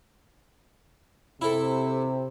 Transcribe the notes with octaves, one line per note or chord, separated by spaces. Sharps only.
C3 E4 A4